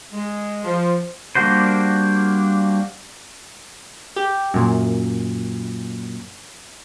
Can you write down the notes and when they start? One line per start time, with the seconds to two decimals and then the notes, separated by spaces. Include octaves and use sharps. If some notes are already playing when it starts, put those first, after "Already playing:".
0.13 G#3
0.64 F3
1.35 G3 A#3 D4 F#4 C5
4.16 G4
4.54 F#2 A#2